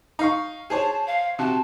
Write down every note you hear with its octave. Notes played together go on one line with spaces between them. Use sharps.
D#4 F5 C#6
G#4 C5 C#5 A5
F5
C3 F#4 A5